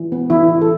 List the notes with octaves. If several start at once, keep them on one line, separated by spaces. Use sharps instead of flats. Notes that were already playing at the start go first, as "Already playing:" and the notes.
Already playing: E3
B3
E3 E4
E3
A4